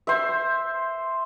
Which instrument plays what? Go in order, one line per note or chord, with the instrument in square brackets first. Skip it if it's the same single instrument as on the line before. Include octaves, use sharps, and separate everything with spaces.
[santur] C5 E5